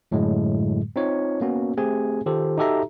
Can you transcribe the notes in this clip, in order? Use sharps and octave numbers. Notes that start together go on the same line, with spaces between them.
F#2 A2 D3 F#3 G#3
C4 D#4 F4 C#5
A#3 B3 C#4 F#4
A3 C4 G4 G#4 G#5
D#3 F4 G4 A4 C5
D#4 F#4 G4 A4 E5 A#5